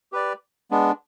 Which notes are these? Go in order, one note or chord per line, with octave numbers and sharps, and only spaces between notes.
G4 B4 D5
G#3 B3 D4